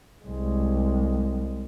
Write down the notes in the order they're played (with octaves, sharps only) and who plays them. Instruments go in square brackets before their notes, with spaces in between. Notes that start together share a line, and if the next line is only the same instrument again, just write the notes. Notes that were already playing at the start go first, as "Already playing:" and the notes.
[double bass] C2 G#3